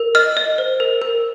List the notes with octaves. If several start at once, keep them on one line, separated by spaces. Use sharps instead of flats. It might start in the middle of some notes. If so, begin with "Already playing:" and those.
Already playing: A#4
D#5 F6
D#5
C5
A#4
A#4